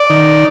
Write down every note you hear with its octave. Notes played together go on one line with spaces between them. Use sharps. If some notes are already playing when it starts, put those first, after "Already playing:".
Already playing: D5
D#3